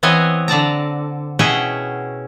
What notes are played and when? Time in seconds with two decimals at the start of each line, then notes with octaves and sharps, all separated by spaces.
0.03 E3 B3 C4 C#5 D#5
0.48 D3 D5 A5 A#5
1.39 B2 C#4 E4 G#4 F#5 G5